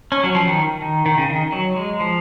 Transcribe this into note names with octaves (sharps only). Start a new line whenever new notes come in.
C#4
F#3
F3
D#3
D#3
D#3
C#3
D#3
F#3
G#3
F3